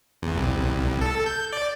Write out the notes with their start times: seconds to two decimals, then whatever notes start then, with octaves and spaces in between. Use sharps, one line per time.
0.22 E2
0.38 C2
1.01 A4
1.26 G6
1.53 D5